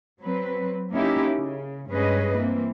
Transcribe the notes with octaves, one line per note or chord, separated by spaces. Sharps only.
F#3 C4 B4
A#3 C#4 D#4 E4 G4
C#3
G2 G#3 C#4 G#4 B4 D#5
E3 A#3 C4